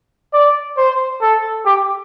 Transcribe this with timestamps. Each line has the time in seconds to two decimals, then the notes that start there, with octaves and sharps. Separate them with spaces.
0.33 D5
0.78 C5
1.22 A4
1.66 G4